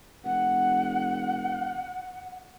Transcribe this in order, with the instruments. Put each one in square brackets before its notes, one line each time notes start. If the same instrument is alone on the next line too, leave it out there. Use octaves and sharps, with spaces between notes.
[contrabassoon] F1 [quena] F#5